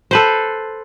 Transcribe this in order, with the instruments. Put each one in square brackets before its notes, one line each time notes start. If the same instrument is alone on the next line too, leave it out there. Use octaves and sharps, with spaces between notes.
[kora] A4 B4 C5